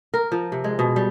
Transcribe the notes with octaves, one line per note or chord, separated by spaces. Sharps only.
A#4
F3
C3
G#3
B2
G3